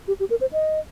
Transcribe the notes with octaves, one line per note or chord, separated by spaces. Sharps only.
G4
G4
A#4
C5
D#5